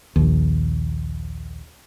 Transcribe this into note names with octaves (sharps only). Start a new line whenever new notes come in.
A#1 D#2